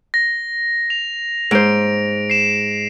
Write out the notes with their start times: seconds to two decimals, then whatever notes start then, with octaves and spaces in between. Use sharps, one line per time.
0.14 A#6
0.90 F7
1.51 G#2 C5 D7 F7
2.30 C7 E7